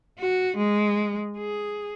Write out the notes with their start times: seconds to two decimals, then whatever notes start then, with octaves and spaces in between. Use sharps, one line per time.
0.19 F#4
0.57 G#3
1.37 G#4